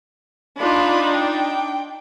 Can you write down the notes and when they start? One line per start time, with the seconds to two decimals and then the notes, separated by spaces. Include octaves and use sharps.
0.59 D4 D#4 F4 B5
1.16 G5